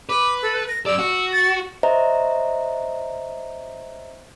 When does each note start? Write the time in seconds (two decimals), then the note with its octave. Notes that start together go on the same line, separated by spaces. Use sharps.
0.09 B4 D6
0.42 A4
0.68 A#6
0.86 F#2 D5 E6
0.99 F#4
1.32 A6
1.83 C5 C#5 D#5 E5 A#5